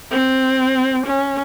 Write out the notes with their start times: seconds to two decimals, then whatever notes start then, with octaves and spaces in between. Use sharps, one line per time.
0.11 C4
1.06 C#4